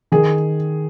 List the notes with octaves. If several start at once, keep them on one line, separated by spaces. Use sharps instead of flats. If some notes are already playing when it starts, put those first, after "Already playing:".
D#3 G#4